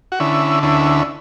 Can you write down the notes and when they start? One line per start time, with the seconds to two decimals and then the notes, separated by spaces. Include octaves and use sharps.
0.12 F#4
0.20 D3 C#4 E4
0.63 D2 C#4 E4